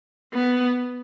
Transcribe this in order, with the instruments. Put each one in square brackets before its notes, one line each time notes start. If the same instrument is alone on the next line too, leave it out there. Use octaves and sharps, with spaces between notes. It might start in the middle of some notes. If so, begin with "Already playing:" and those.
[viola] B3